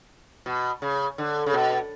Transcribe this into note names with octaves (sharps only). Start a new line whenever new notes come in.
B2
C#3
D3
C#3
B2